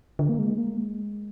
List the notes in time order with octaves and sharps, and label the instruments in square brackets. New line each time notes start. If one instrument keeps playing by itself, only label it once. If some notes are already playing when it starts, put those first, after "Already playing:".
[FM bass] D3
A#3
G#3
A#3
G#3